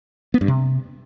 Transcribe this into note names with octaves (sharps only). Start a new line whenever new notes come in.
B3
G2
C3